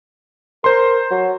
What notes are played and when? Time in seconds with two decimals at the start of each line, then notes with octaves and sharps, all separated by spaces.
0.64 A#4 C5 C6
1.11 F#3